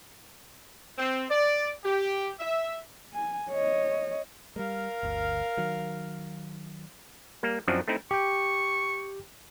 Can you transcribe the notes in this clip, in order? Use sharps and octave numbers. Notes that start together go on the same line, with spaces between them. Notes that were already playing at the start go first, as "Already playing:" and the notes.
C4
D5
G4
E5
G#5
C#5 D#5
G3 G#3 A#4 F5
G1 D2
D#3 F#3
G3 A#3
F#2 F3 F#3 C4 D4 D#4
A3 C4 D#4 E4
G4 G5 C#6